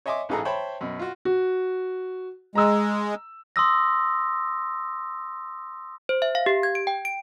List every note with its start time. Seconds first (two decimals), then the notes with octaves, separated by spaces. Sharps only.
0.06 C#5 D#5 E5 G#5 C6 D6
0.29 A1 G#2 E3 G#4 A4 A#5
0.45 C5 C#5 E5 G5 A5 B5
0.81 F#2 B2
0.99 F4 F#4
1.25 F#4
2.55 G#3 A#5 E6
3.56 C6 D#6 E6 A#6
6.09 C5
6.22 E5
6.35 F5
6.46 G4
6.63 G#6
6.75 D7
6.87 G5
7.05 D7